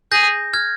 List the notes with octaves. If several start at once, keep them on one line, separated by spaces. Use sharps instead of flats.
G#4 G6 A#6
F6 G#6